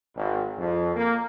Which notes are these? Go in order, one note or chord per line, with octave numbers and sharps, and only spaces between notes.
G#1
F2
A#3